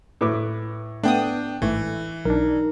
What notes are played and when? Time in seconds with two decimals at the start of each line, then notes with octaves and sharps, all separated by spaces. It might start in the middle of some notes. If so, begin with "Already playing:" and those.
0.21 A2 B4 D6
1.03 A3 B3 D4 G5 D#6
1.62 A1 G#2 E3 A3
2.25 B1 D4 D#4 A#4